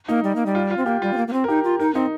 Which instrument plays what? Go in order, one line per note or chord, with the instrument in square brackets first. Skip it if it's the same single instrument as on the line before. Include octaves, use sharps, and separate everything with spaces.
[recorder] A#3 [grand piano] D#4
[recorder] G3
A#3
G3
[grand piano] F4
F4
[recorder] C4
[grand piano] F4
[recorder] A#3 [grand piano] G4
[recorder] G3 [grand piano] F4
[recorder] C4
A#3
A#3
C4
[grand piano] A#4
[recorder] D#4 [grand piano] G4
[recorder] F4
[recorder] D#4 [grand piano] A#4
[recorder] C4 [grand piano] D#4